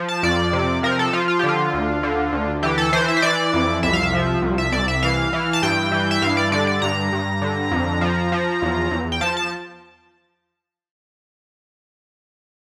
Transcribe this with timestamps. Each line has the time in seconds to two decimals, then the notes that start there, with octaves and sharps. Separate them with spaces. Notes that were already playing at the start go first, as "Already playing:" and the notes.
Already playing: F3
0.08 A5
0.23 F2 D5
0.53 C3
0.83 F3 A#4
0.99 A4
1.13 F3 F4
1.28 F4
1.39 D3 G4
1.49 F4
1.74 D2
2.03 D3
2.33 D2
2.63 E3 G4
2.78 A4
2.93 E3 C5
3.08 E5
3.17 C5
3.22 E3 D5
3.53 F2
3.83 C2 E5
3.93 F5
4.03 E5
4.13 F3
4.42 C2
4.58 E5
4.72 C2 D5
4.88 E5
5.03 E3 F5
5.33 E3
5.53 A5
5.62 G2 G5
5.92 E3
6.11 E5
6.22 G2 F5
6.37 D5
6.52 D3 D5
6.67 D5
6.82 G2 A#5
7.12 G2
7.42 D3
7.71 F2
8.01 F3
8.32 F3
8.62 E2
8.91 E2
9.12 G5
9.21 F3 A5
9.37 A5